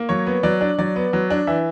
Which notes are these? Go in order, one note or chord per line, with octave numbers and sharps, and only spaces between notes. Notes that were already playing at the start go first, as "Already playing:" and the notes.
Already playing: A#3
F#3 C#5
B3
F#3 D5
D4
F#3 D5
B3
F#3
D4
E3 E5